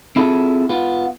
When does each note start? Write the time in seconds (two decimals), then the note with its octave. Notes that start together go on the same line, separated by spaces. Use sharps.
0.16 C4 E4 F4 G#4 A4
0.69 B3 F4